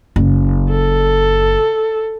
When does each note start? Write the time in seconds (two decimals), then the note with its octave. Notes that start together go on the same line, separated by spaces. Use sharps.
0.16 F#1
0.70 A4